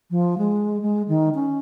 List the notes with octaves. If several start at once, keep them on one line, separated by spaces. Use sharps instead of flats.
F3
G#3
G#3
D#3
C#4